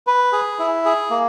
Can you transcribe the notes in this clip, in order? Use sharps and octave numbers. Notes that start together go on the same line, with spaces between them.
B4
G#4
E4
G#4
A#3